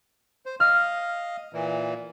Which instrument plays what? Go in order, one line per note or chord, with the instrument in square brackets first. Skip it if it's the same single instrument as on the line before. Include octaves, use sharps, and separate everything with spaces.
[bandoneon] C5
[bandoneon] D#5 F5 [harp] F6
[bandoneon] A#2 E3